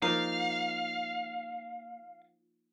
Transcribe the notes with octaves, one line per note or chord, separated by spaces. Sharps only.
F3 A#3 D#4 F5